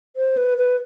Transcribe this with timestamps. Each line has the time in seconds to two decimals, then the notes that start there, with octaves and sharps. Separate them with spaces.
0.16 C5
0.37 B4
0.58 B4